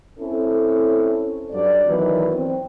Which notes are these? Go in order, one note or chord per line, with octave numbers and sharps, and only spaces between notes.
C4 C#4 E4 A4
G2 F#3 D5
D#3 E3 F#3 B3 B4
C4